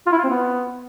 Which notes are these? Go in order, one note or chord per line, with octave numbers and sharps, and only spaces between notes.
F4
E4
F4
C4
B3